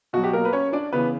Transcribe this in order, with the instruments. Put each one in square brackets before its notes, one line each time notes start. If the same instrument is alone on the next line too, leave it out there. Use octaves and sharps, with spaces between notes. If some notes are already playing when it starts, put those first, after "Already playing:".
[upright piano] B2 F#3 F#4
G4
A#3 A#4
B4
C#4 C#5
D4 D5
C#3 E3 B3 B4